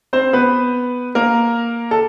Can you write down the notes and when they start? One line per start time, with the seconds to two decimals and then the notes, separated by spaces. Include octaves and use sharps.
0.13 C4 C5
0.33 B3 B4
1.15 A#3 A#4
1.91 A4